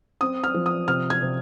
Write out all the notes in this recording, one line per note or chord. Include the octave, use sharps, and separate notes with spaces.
C4 D#6
F6
F3
D#6
C3 F6
G#6
C3